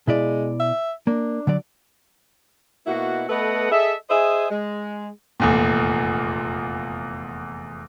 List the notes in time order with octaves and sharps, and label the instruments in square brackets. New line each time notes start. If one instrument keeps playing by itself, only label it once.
[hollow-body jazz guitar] B2 E4 D5 [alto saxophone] G#3
[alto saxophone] E5
[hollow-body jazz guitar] A#3 [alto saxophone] D4
[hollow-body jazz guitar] D3 F#3 D5
[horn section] B2 A#3 E4 F#4
A3 B3 A4 B4 D#5 F#5
G#4 A4 D#5 E5
G#4 C5 D#5 E5 G#5
G#3
[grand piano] F1 E2 A#2